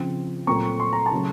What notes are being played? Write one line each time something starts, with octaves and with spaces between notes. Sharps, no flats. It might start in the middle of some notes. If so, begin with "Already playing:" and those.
Already playing: C#3 F3 C4
A#2 F#3 A3 C4 A#5 C#6
C6
A#5
A5 C6
C#3 F#3 A3